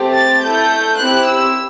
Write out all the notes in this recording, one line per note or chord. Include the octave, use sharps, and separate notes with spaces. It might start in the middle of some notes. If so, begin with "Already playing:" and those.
Already playing: A3 C4 G4
A6
A3 E4 A4 G6
C4 E4 G4 F#6
E6